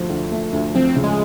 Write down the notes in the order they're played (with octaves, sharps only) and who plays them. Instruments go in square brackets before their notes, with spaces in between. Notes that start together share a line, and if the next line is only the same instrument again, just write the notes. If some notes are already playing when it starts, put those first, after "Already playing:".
Already playing: [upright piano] D2 F3 A3
D3
A3
D2
[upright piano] F3 [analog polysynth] C4
[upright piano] C#3
[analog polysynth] G#3